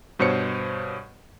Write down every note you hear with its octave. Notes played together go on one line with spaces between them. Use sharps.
G2 B2 C5 C#5 C#7